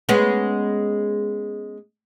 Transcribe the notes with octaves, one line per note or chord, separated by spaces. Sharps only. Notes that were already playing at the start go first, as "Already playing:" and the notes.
G#3 B3 C#4